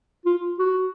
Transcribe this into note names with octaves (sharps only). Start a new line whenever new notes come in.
F4
F#4